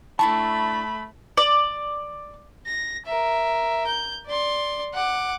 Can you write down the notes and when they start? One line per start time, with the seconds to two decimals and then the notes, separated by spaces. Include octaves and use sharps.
0.19 A3 D4 E4 A5 B5 C#6
1.37 D5
2.67 A#6
3.06 A#4 E5
3.87 G6
4.26 D5 C6
4.94 F#5 D6